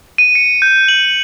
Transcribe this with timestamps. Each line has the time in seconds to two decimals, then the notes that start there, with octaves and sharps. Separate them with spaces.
0.18 D#7
0.35 C#7
0.62 G6
0.88 F#7